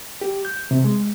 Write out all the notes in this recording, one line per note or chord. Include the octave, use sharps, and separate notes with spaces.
G4
G6
C3
G#3